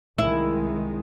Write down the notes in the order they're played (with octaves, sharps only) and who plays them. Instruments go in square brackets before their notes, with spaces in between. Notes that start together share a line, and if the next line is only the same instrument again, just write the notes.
[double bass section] C2 D#3 G#3 [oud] E4